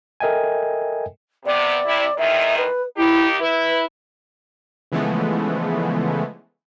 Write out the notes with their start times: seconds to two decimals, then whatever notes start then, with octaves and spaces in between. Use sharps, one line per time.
0.20 A4 A#4 D#5 E5 G5 G#5
1.46 C3 B3 D5
1.86 C3 E4
2.18 E2 A#2 D#3 E5
2.58 B4
2.97 D#2 D#4 E4 G4
3.40 E4 B4
4.92 C#3 E3 F3 G#3 A3 B3